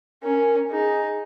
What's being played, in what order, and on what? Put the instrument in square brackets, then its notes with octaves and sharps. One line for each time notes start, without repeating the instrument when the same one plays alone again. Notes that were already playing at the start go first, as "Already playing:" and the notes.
[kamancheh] C#4 [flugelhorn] A#4
[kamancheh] D#4 [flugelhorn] G#4